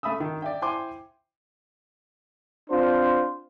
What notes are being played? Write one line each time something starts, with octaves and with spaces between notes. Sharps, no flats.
A3 E5 B5 D#6 E6
D#3
D5 E5 G5
E4 C5 G5 G#5 C6 D6
C4 D4 F4 C5